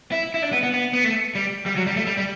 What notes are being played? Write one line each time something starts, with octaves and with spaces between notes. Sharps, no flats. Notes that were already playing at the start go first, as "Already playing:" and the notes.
E4
E4
D4
B3
B3
B3
B3
A3
G3
G3
F#3
G3
A3
G3
G3